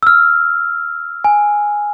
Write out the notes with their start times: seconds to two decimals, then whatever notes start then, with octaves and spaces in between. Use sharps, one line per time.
0.03 E6 F6
1.24 G#5